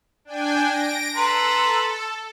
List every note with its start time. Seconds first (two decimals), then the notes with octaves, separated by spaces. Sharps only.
0.25 D4 G5 G#5
0.64 A#6 D7
1.15 A4 B4 A#5 C6